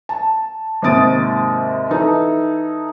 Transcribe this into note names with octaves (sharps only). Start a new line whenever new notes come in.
A5
D#2 G#2 C3 D#6 A6 D7
E3 D#4 A4